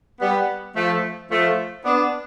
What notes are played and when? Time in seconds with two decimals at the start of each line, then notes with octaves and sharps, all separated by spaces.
0.21 G3 B3
0.76 F3 A3
1.30 F3 A3
1.85 B3 D4